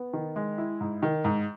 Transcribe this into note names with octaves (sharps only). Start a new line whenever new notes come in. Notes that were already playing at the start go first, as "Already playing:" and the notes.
Already playing: B3
D#3
G#3
E4
G#2
D#3
G#2